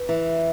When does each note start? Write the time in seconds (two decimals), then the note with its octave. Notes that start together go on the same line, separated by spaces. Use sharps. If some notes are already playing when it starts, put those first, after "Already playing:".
Already playing: B4
0.09 E3